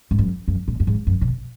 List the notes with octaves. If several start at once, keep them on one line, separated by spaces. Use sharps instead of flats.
G#2
F#2
F#2
A#2
F#2
G#2
F#2
B2